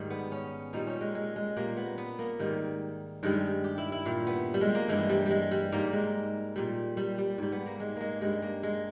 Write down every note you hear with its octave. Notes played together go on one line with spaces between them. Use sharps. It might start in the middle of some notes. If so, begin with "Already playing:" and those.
Already playing: G#2 D#3 G3
B3
C#4
A#2 G3 D#4
C#4
G#3
G#3
G#3
A#2 G3 A#3
B3
B3
A#3
G#2 D#3 G3
G2 D#3 G3 G#3
G4
E4
E4
A#2 G3
B3
G3
G#3
A#3
G2 E3 G3 G#3
G3
G3 G#3
G3
G#2 G3 A#3
G#3
A#2 G3
G3
G3
G#2 G3
B3
A#3
G#3
G#3 A#3
G2 G3 G#3
A#3
G#3